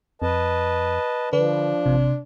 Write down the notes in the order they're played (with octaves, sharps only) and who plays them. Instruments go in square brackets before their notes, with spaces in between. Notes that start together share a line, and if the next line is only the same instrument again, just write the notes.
[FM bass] F2 [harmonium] B4 D#5 A5
[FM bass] D3 [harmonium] F3 [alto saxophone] D4 [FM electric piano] B4
[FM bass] A1 [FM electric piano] C3